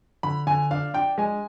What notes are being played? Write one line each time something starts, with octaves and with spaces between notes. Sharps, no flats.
D3 B5
D3 G#5
D4 F5
D4 G5
G#3 G#5